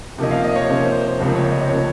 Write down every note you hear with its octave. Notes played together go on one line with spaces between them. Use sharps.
C3 F3 A#3 C#4 D#5
F5
D#5
C#5
C3 F3 A#3 C#4 C5
C5
C5
C#2 C3 F3 A#3 C5
C#5
D#5
C3 F3 A#3 C#5